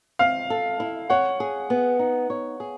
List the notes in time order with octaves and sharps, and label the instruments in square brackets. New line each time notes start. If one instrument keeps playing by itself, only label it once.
[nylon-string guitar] C4 [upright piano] F5
[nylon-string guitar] A4
E4
[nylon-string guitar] C#5 [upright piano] F#5
[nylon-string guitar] G#4
B3
D#4
C#5
G#4